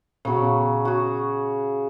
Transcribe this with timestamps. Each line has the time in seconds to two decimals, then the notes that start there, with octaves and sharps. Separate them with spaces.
0.25 A#2 C#3 F#3 B3
0.85 F#4 G#4